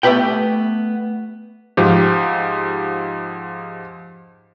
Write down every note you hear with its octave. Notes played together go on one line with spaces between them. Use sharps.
A3 B3 G4 B4 G5
G#2 F3 G4